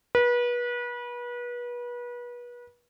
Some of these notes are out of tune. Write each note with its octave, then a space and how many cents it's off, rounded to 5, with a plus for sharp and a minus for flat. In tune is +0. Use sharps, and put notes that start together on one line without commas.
B4 -30